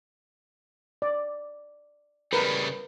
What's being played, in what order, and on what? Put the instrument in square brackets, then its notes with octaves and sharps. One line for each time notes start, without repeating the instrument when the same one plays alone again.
[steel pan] D5
[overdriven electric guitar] C#3 G3 [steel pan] A#4 B4